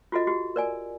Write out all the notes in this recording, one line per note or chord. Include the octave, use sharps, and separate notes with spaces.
F4 F#4 A4 D#5
F#4 G4
A#4 D5 G#5